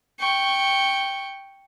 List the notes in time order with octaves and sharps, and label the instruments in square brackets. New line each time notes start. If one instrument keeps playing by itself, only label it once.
[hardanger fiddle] G5 C#6